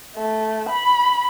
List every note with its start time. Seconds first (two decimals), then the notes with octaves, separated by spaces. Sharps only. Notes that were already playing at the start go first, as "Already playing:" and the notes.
0.16 A3
0.69 B5